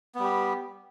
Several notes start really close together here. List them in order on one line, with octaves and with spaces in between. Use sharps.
B3 G3 G4